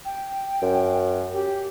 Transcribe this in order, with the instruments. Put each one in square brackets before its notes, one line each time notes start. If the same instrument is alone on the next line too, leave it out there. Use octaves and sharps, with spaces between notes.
[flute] G5
[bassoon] F#2
[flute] G4